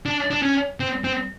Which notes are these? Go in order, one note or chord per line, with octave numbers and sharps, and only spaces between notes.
D4
D4
C#4
C4
C4